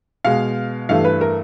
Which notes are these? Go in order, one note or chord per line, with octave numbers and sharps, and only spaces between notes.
B2 G#3 F5
G2 E3 A3 F5
B4
A#4